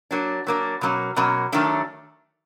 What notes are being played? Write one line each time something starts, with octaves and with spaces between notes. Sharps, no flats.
F#3 A#3 D4
F#3 A#3 D4
B2 F#3 A#3 C#4
B2 F#3 A#3 C#4
D#3 F#3 A3 D4